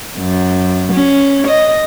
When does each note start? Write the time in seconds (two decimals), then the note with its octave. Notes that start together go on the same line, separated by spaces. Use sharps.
0.18 F#2
0.93 C#4
1.47 D#5